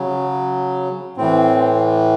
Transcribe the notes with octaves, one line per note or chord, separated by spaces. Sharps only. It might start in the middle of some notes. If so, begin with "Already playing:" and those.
Already playing: C#3 F#3
A2 E3 C4